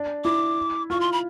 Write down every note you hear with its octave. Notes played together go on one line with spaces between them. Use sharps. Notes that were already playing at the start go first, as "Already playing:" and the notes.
Already playing: D4
E4 D6
F4 C#6
C6
B5